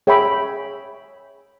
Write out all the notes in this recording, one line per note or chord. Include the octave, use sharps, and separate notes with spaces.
G#4 C#5 E5 G5 B5